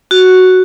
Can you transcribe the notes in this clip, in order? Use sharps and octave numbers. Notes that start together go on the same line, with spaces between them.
F#4